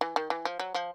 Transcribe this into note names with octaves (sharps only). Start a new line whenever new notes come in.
E3
D#3
E3
F3
F#3
F3